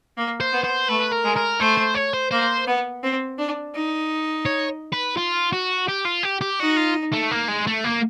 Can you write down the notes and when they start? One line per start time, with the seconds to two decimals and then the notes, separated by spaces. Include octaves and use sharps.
0.17 A#3
0.40 C5
0.53 B3
0.64 C5
0.89 A3 B4
1.12 A#4
1.24 G#3
1.36 A#4
1.60 A3 C5
1.78 C5
1.95 C#5
2.14 C5
2.31 A#3 C5
2.67 B3
3.03 C4
3.38 D4
3.75 D#4
4.46 C#5
4.92 B4
5.17 F4
5.53 F#4
5.88 G4
6.05 F4
6.23 G4
6.41 G4
6.60 D#4 F#4
6.77 F4
7.12 A3
7.31 A#3
7.48 G#3
7.67 A3
7.84 A#3